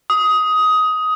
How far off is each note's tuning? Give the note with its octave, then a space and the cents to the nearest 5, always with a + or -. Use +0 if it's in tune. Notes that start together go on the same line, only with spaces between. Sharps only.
D#6 +15